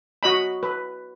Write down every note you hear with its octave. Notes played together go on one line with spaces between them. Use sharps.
F#4 D#5 B5
B4